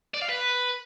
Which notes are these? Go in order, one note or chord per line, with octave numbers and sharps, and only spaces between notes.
D5
F5
B4